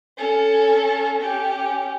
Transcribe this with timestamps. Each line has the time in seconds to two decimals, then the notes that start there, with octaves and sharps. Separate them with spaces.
0.18 C#4 A4
1.23 C#4 G4